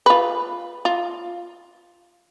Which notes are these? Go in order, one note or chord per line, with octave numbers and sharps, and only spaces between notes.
F4 B4
F4